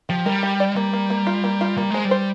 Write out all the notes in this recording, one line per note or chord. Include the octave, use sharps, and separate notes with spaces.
F3 G4
G3 A#4
G4
D5
G3 A#3
A#3
A#3
F4
A#3
F4
G3 A#3
G#3 C5
G3
C5